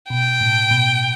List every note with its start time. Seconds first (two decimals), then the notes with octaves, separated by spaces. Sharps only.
0.10 B2 G5
0.41 A2
0.71 B2